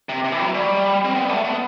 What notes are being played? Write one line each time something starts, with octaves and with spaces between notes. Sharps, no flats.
C3
C3
E3
F#3
G3
C4
B3
G3
A3
B3